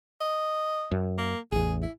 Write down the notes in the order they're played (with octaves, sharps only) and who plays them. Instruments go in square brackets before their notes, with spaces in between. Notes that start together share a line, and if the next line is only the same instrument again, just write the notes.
[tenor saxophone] D#5
[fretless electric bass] F#2
[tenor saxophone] A#3
[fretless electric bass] A1 E2 [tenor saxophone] G#4
[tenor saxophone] E4